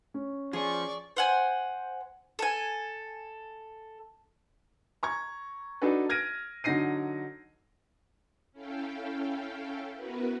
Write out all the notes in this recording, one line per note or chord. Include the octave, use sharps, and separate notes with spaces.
C#4
F3 G#4 D5 C#6
C5 F#5 G#5
A4 G#5
A#5 C#6 G#6
D4 D#4 F#4 A4 B4
F6 G#6 A#6 D7 D#7
D3 F#3 D#4 A#6 C7 D#7
C#4 E4 A4 F5 G5
B3 E4 F#4 A#4 B4